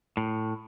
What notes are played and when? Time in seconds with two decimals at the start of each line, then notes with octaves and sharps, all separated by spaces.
0.17 A2